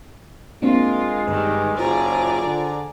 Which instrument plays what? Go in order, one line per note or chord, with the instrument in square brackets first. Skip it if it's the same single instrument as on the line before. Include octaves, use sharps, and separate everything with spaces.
[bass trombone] G#3 [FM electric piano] A#3 C4 D4 [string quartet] F4 A#4
[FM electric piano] G2 B4 [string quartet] D#3 G3
[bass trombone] F#1 [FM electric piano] F4 C5 [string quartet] G#4 D5 A#5
[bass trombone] D3